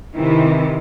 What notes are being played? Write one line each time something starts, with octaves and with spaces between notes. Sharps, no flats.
C3 D#3 E3